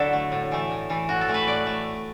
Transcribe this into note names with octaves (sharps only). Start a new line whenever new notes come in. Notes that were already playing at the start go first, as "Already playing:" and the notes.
Already playing: D3 F#3 E4 F#4 A4
A3
A2
E3 A3
A2
E3 A3
A2 F#4
A4
E3 A3
B4
A2 D5
A3